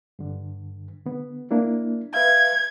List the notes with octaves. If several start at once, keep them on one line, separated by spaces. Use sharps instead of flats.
G2 D3
D3 B3
A#3 D4 E4
B4 E5 F5 G#6